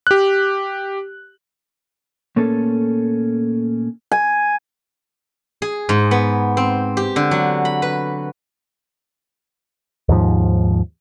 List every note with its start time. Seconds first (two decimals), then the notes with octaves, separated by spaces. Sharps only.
0.07 G4 F#6
2.36 A#2 A3 A#3 C#4 A4
4.12 G#5
5.62 G#4
5.89 G#2
6.11 B3
6.57 C4
6.97 G4
7.16 D3
7.31 F#3
7.65 B5
7.82 B4
10.09 D#2 G#2 F3